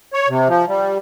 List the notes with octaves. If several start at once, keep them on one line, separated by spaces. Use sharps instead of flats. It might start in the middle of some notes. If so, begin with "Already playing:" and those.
C#5
C3
F3
G3